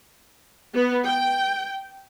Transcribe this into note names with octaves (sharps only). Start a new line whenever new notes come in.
B3
G5